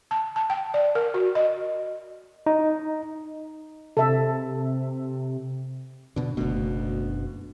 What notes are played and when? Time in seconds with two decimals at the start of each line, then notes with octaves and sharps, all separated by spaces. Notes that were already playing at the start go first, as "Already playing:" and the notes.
0.11 A5
0.36 A5
0.50 G5
0.74 D5
0.95 A#4
1.14 F#4
1.35 D#5
2.46 D#4
3.97 C3 A4 E5
6.16 B2 D3
6.37 F#1 D2 B2